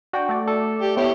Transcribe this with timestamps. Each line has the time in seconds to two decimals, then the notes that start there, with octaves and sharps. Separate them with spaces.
0.13 D4 F#4 G5
0.29 A3 D5
0.47 A4
0.81 G4
0.97 B3 E4 G4 C#5